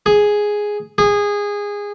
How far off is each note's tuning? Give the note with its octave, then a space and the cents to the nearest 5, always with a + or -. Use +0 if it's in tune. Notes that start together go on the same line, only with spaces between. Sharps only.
G#4 +0
G#4 -20